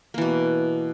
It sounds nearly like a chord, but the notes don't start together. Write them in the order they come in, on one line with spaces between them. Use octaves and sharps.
A#3 E3 B2